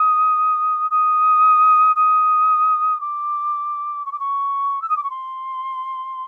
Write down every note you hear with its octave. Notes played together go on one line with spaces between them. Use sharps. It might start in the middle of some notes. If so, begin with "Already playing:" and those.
Already playing: D#6
D#6
D#6
D6
C#6
D6
C#6
E6
D#6
D6
C#6
C6